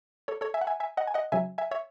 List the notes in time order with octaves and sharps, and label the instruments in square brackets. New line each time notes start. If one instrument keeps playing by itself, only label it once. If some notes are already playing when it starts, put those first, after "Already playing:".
[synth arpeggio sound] A4 C#5
A4 C#5
E5 G#5
F#5
E5 G#5
E5 G#5
D#5 F#5
G#5
D#5 F#5
C#3 F#3 E5 G#5
E5 G#5
C#5 E5